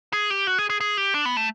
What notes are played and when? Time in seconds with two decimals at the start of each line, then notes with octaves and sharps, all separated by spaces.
0.13 G#4
0.30 G4
0.47 F#4
0.58 G#4
0.70 G#4
0.80 G#4
0.97 G4
1.14 D4
1.25 B3
1.37 A3